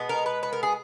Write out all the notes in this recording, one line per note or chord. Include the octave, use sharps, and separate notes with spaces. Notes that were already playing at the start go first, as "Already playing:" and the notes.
Already playing: B2 G#3 B3
A#4
B4
B4
A#4
G#4